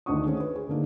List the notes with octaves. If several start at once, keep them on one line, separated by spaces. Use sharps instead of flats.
D2 D#3 D4 F#5 C#6 D#6
A3 C#4 C5
B4
G#4
D3 A#3 D#4